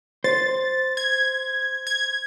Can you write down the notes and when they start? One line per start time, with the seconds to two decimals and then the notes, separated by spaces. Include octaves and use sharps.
0.24 C5 A6
0.97 G#6
1.87 G#6